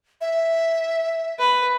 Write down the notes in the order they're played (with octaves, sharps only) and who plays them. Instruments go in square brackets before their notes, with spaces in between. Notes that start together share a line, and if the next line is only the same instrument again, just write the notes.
[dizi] E5
[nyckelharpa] B4